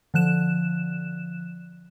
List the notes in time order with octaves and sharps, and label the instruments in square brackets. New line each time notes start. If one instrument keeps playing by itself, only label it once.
[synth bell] D3 F3 F#6 E7